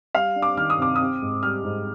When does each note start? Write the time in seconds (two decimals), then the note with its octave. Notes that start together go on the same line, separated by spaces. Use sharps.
0.15 G3 F5
0.36 D4
0.42 D6
0.57 D#3 F6
0.70 D#6
0.78 C3 D6
0.96 C4 D#6
1.22 G#2
1.43 G3 F6
1.64 G#2